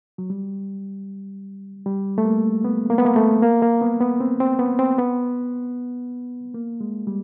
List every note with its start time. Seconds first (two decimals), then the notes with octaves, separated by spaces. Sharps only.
0.18 F#3
0.30 G3
1.86 G3
2.18 A3
2.25 A#3
2.64 B3
2.90 A#3
2.98 B3
3.05 A#3
3.16 A3
3.42 A#3
3.62 A#3
3.81 B3
4.01 B3
4.20 C4
4.40 C4
4.59 B3
4.79 C4
4.98 B3
6.54 A#3
6.81 G#3
7.07 G3